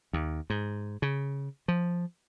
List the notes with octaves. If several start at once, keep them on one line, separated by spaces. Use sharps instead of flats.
D#2
G#2
C#3
F3